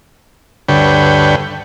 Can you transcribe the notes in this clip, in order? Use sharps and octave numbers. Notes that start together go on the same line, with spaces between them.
D2 G2 D3 B4 C#5 G5